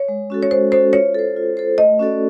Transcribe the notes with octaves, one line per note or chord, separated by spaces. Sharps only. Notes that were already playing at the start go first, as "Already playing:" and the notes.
Already playing: C#5
G#3
C#4 F#4 A4
C#5
G#3 C5
C#4 F#4 A4 C5
F4 C#5
A4 C5
F4
A4 C5
A3 D#5
C#4 F#4 A4 D5